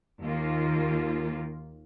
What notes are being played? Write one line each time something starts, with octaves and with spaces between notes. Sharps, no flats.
D#2 D#3 A#3 F4